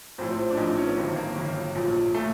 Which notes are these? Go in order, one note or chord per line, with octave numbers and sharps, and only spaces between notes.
A#1 A2 F3 C4
C4
D4
A#1 A2 F3 D#4
C#4
B3
G1 G2 D#3 F#3 C4
A#3
G1 G2 D#3 F#3
A#1 A#2 F3
A#2 A3